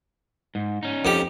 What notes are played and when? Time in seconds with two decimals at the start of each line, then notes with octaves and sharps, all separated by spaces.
0.55 G#2
0.83 C#4 D#4
1.05 F2 G4